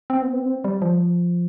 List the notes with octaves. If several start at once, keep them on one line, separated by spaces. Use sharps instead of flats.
C4
B3
C4
B3
C4
G3
F3